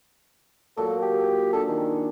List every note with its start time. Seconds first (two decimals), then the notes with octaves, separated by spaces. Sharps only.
0.77 A#2 F#3 A4
1.02 G4
1.53 D4 G#4 A4
1.68 D#3